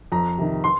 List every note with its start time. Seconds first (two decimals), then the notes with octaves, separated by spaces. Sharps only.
0.12 F2 A#5
0.38 C3 D#3
0.64 C6